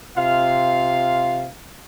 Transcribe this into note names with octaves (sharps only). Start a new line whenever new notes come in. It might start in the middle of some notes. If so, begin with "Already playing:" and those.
C3 F4 F5